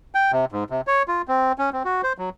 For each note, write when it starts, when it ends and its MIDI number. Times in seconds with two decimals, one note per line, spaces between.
0.15 0.32 79
0.32 0.45 48
0.52 0.64 44
0.70 0.81 48
0.87 1.03 73
1.08 1.22 65
1.28 1.52 60
1.58 1.70 61
1.73 1.83 60
1.85 2.01 66
2.03 2.13 72
2.18 2.30 54